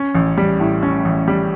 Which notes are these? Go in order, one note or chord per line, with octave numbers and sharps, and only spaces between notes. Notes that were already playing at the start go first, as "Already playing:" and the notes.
Already playing: C#4
A1
G3
A2
C#4
A1
G3